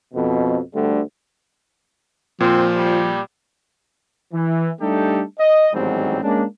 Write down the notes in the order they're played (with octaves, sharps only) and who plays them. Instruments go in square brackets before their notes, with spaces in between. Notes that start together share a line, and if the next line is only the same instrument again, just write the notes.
[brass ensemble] F2 B2
D2 D3 G3 A3
[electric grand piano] A#2 [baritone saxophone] F3 [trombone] C4
[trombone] G3
[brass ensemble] E3
G3 A3 D4 D#4 G4 A4
D#5
A1 D#2 G#2 F#3 G3 C4
G#3 A#3 C#4 D4